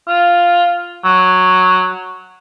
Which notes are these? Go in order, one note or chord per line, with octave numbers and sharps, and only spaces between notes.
F4
F#3